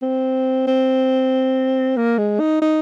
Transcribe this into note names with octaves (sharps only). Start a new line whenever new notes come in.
C4
C4
A#3
G#3
D#4
D#4